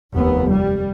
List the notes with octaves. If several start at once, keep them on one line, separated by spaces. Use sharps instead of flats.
F1 D#2 B3
G3